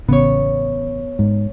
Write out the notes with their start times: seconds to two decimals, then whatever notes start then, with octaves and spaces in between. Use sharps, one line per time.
0.08 A1 C#3 B3 C#5
1.19 G#2